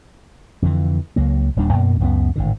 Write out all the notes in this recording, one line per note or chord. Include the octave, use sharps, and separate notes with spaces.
F2 D3 E3
C#2 F#3 A#3
D#1 D#2 G3 D4
F#2 B2 A#3
C#2 F#2 F3 B3
G#1 A2 D3